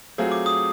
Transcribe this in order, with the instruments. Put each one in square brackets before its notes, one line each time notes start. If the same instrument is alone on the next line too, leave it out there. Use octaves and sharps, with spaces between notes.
[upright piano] F#3 A3 C4 F4 G#4
[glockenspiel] D6
D#6